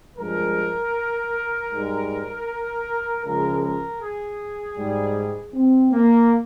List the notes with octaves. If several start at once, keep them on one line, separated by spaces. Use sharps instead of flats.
G2 F3 G#3 A#4
G#2 G3
C#2 C#3 F3 G#3 A#4
A#4
G#4
G#2 G3
C4
A#3